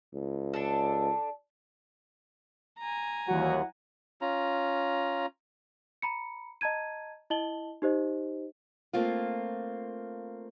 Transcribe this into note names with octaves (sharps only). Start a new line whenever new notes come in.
C#2
D4 A4
G#5 A#5
D#2 E3 F#3 G3 E4 F#4 F#5
C#4 F4 A#5
A#5 B5 C#7
D#5 A5 A#5 G#6 D#7
E4 D#5 A5 F#7 G7
D#4 G4 C5 D#5
A3 A#3 C4 F4